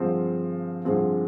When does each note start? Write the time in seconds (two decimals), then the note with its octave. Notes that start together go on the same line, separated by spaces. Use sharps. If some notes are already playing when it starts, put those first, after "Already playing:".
Already playing: G2 D3 F3 G#3 C4
0.85 G2 D3 F3 G#3 C4